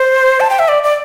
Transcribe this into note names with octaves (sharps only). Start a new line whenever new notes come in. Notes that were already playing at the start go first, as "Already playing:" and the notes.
Already playing: C5
A5
G5
E5
D5
D5